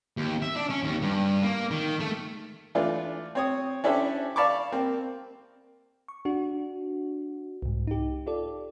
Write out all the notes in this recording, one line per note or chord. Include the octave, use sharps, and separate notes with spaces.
D#2
E5
D4
C#4
D#2
G2
A#3
D#3
A3
E3 A3 D4 F4
C4 C#5 D#6
C#4 D4 E4 G4 A4 C5
D5 F5 A5 B5 C#6 D6
A#3 C4
C#6
D4 F#4
C2 G#2
D#4 G4
F4 G4 A4 D5